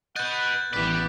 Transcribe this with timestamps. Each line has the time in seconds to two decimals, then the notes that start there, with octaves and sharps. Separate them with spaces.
0.16 B4 D#5 F#5 F#6 G6 A6
0.73 A1 E3 B3 G4 B4 D5 D6 B6